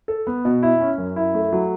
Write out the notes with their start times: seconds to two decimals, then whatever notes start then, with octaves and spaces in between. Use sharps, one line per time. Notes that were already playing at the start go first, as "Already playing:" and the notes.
0.08 A4
0.27 B3
0.45 B2
0.63 E4
0.80 C#4
0.98 F#2
1.16 E4
1.35 A3
1.53 F#3